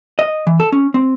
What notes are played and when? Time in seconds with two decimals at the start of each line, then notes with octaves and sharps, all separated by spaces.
0.19 D#5
0.47 E3
0.60 A4
0.72 C#4
0.94 C4